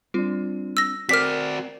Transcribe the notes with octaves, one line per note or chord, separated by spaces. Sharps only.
G3 C4 D4 F4
E6 A#6
C4 F#4 A#4 D5 D6 F6 B6 C7